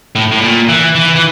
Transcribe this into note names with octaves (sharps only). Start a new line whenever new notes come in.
A2
A2
A#2
E3
E3
E3